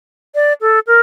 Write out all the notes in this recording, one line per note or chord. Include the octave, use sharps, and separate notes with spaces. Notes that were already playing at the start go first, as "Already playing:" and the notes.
D5
A4
A#4